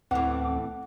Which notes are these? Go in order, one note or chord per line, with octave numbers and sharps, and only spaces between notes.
D2 A2 E3 C4 F#5 D6